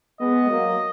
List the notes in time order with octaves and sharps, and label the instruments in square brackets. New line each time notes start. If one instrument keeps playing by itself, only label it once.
[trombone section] G#3 B3 [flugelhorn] D#5
[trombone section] F#3 A#3